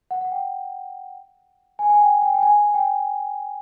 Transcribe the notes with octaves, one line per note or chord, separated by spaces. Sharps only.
F#5
F#5
G5
G#5
G#5
G5
G5
G5
G#5
G5